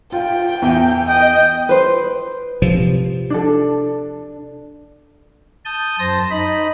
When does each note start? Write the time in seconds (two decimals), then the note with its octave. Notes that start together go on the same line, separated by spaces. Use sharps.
0.12 F4 G5
0.62 E2
1.09 D#5 G5
1.69 B4 C5
2.62 C3 F3
3.30 D4 A4
5.65 A5 D#6 G6
5.99 F#2 C5 A5 A#6
6.31 D#4 D#5 B5